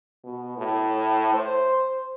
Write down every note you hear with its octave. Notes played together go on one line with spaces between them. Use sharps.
B2
A2
C5